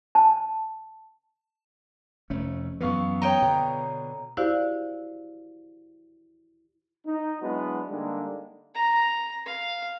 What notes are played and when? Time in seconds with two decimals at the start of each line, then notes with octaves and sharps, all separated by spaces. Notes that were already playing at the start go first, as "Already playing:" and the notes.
0.15 A5
2.30 F1 A3 C#4
2.81 F#2 E3 B3 F5 C#6
3.22 C#5 D#5 G5 A#5
3.42 B2 D3
4.37 E4 F#4 G4 C5 D5 F5
7.07 D#4
7.42 F#3 G#3 B3 D4 E4 F#4
7.90 D3 G3 G#3 A#3 D4 D#4
8.75 A#5
9.46 F5